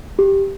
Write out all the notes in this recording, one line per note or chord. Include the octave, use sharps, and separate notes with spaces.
G4